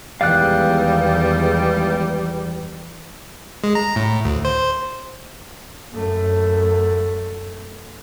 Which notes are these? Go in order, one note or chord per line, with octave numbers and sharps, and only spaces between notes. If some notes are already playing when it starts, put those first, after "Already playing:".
E2 D#3 E3 G3 G#3 F5 F#6
G#3
A#5
A2
D2
C5
F#2 A3